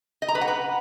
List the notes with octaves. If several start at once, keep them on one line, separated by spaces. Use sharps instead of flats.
D#5
A#5
B4
F#5
B4